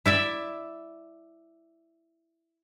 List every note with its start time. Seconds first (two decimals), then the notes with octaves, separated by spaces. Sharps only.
0.06 E4 D5 E5